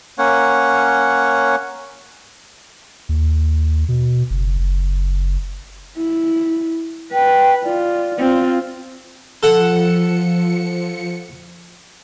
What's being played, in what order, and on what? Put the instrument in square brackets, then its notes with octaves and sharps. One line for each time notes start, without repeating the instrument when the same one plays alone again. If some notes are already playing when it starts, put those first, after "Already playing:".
[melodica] A#3 C#4 C#5 F#5
[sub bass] D#2
B2
F#1
F#1
[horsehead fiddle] E4
[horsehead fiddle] B4 [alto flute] G5
[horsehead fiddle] F4 [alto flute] D5
[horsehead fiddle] C4 F4
[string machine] F3 C#7 [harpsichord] A4 F#5